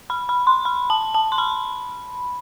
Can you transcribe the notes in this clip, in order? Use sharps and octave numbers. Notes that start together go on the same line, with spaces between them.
B5
B5
C6
B5
A5
A5
C6
B5